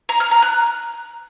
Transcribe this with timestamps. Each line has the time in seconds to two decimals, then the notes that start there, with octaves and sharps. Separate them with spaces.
0.09 A#5
0.20 F6
0.31 A#5
0.42 F#6